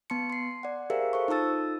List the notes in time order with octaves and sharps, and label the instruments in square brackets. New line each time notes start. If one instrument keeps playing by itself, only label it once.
[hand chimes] B3 A5 C6 C#7
C6 C7
D5 F#5
G4 G#4 A#4 C5 E5 F5
A4 C5 C#6
D#4 F4 A4 A5 E6 A6